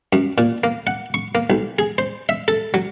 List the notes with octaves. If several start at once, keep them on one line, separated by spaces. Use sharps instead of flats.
F#2
A#2
A#3
F#5
C#6
A#3
B1
G#4
C5
E5
A4
F#3